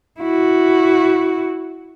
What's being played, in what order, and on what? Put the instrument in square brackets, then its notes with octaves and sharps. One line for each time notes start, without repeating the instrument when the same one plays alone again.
[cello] E4 F#4